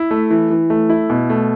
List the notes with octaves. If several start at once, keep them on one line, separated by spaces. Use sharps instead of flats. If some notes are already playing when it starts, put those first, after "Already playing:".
Already playing: E4
A3
E3
E3
A3
E4
B2
A3